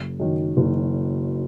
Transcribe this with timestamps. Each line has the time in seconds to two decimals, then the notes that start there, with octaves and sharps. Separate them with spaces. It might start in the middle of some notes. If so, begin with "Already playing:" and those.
Already playing: F#1
0.20 F#2 D#3
0.57 F#1